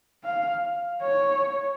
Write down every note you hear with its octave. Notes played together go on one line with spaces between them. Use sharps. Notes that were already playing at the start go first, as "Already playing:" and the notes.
F5
C#5